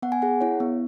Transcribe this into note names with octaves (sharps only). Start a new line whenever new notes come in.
B3 F#5
G#5
G#4 F#5
E4 C#5
B3